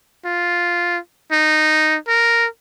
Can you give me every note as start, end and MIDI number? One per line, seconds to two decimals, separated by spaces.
0.25 0.99 65
1.31 1.97 63
2.08 2.47 70